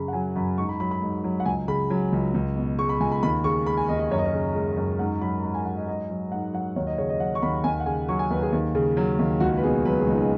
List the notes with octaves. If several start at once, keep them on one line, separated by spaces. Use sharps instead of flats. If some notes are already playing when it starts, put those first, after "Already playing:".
Already playing: F#2 C#3 B5
F#5
F#3 G#5
F#2 B5
G#2 C#6
B5
F#3 B5
B5
G#2
F#3
F#5
C#2 G#5
C#3 B5
F#3
C#2
C#2
B2
G#3 C#6
B5
C#2 G#5
B5
D#2 B5
C#3 C#6
G#3 B5
G#5
D#2 D#5
D#5
F#2 C#5
D#5
C#5
C#3
G#3
F#2
G#2 F#5
F#3 B5
G#2 B5
G#5
F#3 F#5
D#5
G#2 D#5
F#3
G#2 F#5
F#3 F#5
D#2 C#5
D#5
C#3 C#5
D#5
F#3 F#5
C#6
D#2 B5
D#2 G#5
F#5
C#3 G#5
F#3 C#6
G#5
D#2 B4
G#4
D#2
C#3
F#3
D#2
C#2 F#4
B4
B2 G#4
F#3 B4
G#4
C#2
D#4
G#4